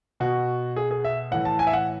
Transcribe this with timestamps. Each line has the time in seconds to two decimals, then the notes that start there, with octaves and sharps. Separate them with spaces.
0.20 B2 F#4
0.76 G#4
0.91 G#4
1.04 E5
1.31 A2 E3 F#5
1.45 A5
1.59 G#5
1.67 E5
1.73 F#5